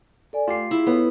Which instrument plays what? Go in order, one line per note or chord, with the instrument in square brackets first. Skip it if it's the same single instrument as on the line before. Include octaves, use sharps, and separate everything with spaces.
[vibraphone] A4 D5 G#5
[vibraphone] A3 [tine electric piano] F4 G4 C7
[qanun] E4 [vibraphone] G#4
[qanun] B3 [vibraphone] A4 C#5